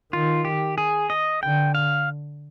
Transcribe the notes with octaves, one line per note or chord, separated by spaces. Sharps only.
D#3 F4
G4
G#4
D#5
D3 G5
F5